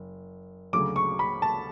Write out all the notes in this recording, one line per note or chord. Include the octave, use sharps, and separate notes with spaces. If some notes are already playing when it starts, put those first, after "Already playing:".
Already playing: F#1
D2 C#3 F#3 D6
C#6
B5
A5